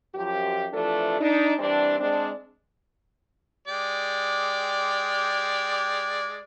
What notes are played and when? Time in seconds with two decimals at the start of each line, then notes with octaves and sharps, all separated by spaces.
0.15 F#2 F3 G4
0.73 C3 E3 F3 A3 D4 A4
1.20 D4 D#4
1.59 E3 G3 C4 D4
2.00 G#3 C4 D4
3.68 G#3 G4 D5